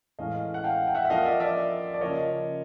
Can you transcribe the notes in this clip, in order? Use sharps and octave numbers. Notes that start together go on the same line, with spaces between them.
A2 E3 G#3 C#4 D#5 F5
F#5
F5 G5
G5
E5 F#5
E5
F3 A#3 C#4 D#5 F5
D5 E5
D5 E5
D5
C#3 F3 A#3 C#5 D#5